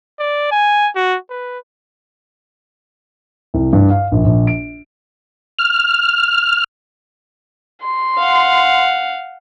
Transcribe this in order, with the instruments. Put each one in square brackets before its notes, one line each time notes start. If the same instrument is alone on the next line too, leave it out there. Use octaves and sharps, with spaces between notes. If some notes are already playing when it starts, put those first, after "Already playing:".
[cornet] D5
G#5
F#4
B4
[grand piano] C2
G2
F5
A#1
A#1
D7
[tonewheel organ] F6
[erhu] C6
[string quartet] F5 F#5